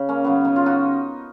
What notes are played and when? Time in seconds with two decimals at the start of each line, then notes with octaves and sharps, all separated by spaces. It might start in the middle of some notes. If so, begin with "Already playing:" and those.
Already playing: C#3
0.09 A#3 C#4
0.24 C#3 F#3 B3
0.45 B3 D#4
0.56 F4
0.66 D#4 F#4